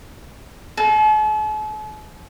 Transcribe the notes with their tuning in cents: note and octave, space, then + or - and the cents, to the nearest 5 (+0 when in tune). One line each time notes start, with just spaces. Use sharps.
A4 -45